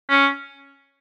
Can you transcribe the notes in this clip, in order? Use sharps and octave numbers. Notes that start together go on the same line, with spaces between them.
C#4